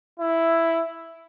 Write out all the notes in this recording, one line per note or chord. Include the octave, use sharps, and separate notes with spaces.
E4